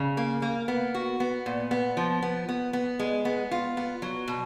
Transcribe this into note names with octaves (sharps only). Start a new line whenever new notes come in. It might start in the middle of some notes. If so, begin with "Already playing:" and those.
Already playing: C#3
A#3
A#3
B3
F#4
B3
A#2
B3
F3
B3
B3
B3
G#3
B3
F4
B3
F#3
B2